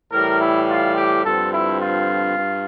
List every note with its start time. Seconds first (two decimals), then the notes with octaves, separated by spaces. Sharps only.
0.12 A2 E3 G3 A#4
0.41 E4
0.69 F4
0.97 G4
1.24 G2 D3 F3 C4 A4
1.52 E4
1.80 F4
2.37 G2